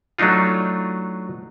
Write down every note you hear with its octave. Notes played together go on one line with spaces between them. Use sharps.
F#3 A3 D4 D#4 F4